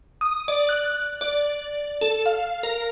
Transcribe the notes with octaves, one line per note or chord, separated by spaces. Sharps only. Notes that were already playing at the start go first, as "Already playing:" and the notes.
D#6
D5
F#6
D5
A4
F5
A#4